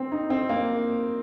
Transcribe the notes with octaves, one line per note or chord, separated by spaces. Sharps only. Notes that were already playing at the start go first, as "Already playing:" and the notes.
Already playing: C4
D#4
C4
A#3